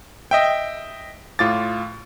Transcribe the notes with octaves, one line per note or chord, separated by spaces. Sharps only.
D#5 E5 G5
A2 F4 D6 A6